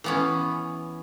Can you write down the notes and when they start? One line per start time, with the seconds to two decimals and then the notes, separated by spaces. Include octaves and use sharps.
0.04 E3 B3 C#4